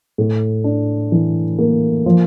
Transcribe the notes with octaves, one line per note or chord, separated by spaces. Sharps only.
A2
D4
E3
A#3
F3